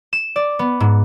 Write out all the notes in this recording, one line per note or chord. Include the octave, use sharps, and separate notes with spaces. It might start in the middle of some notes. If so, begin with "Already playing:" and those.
E7
D5
B3
G#2